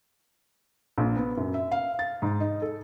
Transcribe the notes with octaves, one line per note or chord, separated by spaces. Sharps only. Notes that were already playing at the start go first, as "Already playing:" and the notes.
A#1
B3
F#2
E5
F5
A6
G#2
D#4
A4